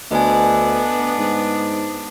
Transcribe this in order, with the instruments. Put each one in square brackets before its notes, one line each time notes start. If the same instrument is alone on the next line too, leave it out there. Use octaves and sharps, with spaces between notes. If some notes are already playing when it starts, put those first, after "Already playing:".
[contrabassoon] D2 [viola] B3 D4 [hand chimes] D#5 G#5
[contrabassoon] G#2